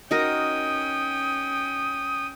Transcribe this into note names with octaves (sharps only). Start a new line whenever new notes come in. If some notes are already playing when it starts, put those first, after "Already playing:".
C#4 D#4 F#4 A#4 G5 D#6